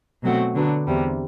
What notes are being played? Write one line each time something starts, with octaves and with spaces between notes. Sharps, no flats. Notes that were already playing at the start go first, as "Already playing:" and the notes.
B2 F#3 A3 C4 F#4
D3 F#3 B3 D4
E2 C3 G3